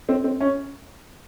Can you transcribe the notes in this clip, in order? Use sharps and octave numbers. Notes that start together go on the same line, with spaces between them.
C4
C4
C#4